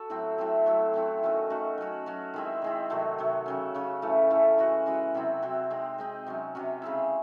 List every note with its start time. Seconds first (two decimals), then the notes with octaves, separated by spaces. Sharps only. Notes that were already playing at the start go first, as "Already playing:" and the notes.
Already playing: F#4 A4
0.10 A2 F#3 C4 E4
0.38 A2 F#3 C4 E4
0.66 F#3 A3 C4 E4
0.94 F#3 A3 C4 E4
1.23 D#3 A3 C#4 F#4
1.50 D#3 A3 C#4 F#4
1.78 F#3 C#4 F#4
2.06 F#3 C#4 F#4
2.34 D#3 G#3 C4 E4
2.62 D#3 G#3 C4 E4
2.90 C3 D#3 F#3 A3
3.18 C3 D#3 F#3 A3
3.46 C#3 F#3 C#4
3.74 C#3 F#3 C#4
4.02 A2 E3 A3 C#4
4.30 A2 E3 A3 C#4
4.58 E3 G#3 C#4 F#4
4.86 E3 G#3 C#4 F#4
5.14 C3 F#3 C4 E4
5.42 C3 F#3 C4 E4
5.70 G#3 C4 D#4
5.98 G#3 C4 D#4
6.26 C3 F#3 C#4
6.55 C3 F#3 C#4
6.82 C#3 G#3 C4 E4